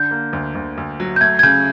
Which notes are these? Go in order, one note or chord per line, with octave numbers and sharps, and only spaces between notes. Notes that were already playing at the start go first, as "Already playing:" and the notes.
Already playing: D3 G6
A#3
D2
D2
D2
F#3
G6
A3 G#6
G#6
C#3 G6